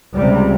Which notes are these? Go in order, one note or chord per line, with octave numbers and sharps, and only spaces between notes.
C#2 C3 G3